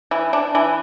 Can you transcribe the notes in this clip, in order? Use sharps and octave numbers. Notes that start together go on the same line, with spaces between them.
E3
D4
E3